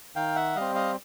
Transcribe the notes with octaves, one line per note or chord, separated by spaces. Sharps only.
D#3 F5 G5
E5 F#5
G3 C4 D#5 F5
D#5 F5